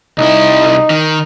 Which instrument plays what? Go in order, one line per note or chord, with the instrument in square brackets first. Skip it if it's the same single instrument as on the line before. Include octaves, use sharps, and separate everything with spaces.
[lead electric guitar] C2 E4 [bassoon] D#4
[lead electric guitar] D#3